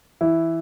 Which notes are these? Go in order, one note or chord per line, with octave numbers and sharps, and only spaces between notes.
E3 E4